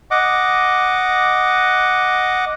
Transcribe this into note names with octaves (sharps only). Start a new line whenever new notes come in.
D#5 F#5 D6